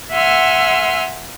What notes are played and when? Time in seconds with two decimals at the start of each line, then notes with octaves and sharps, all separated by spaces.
0.12 E5 F#5 G#5 C6 E6 F6